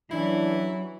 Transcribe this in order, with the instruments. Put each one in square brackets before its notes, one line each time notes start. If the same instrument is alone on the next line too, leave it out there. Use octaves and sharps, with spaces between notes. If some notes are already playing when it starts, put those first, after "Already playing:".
[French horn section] G2 C#4 D4 [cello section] E3 [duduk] F#3 [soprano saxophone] E4